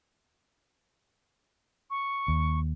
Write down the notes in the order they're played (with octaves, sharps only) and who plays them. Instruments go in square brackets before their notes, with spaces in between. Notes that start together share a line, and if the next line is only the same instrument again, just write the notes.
[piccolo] C#6
[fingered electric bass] D#2